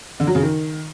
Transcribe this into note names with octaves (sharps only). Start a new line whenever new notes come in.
D3
F#3
C#3
D#3